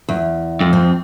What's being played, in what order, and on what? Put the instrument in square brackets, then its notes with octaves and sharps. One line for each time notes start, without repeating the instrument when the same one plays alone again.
[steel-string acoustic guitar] E2
[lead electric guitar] F2
[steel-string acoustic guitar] C4